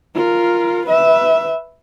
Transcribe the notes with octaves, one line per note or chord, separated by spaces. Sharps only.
F4 A#4
B4 E5